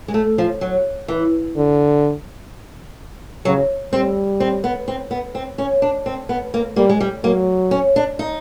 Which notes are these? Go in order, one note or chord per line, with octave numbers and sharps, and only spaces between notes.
G#3
A3
F3
F#3
E3
D3
C#3 F#3
G3 C4
C4
B3
C4
B3
C4
C#4
D4
C4
B3
A#3
G3 A#3
G#3
G3
F#3 A#3
C#4
D4
D#4